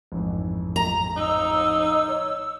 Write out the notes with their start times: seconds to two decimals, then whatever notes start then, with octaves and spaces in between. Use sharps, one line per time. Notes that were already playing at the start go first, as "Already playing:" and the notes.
0.12 A1 F2 G#2
0.76 A#5
1.16 D#4 E6
2.08 C#5